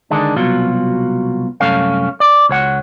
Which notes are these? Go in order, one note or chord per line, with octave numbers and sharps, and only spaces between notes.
D3 D#3 G#3 D4
C2 B2 F#3 F4
C2 F#2 A3 C#4 F5
D5
C#2 C#5 F#5